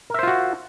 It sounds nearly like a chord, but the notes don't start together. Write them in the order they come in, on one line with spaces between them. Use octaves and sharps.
A#4 E5 C5 F4 F#4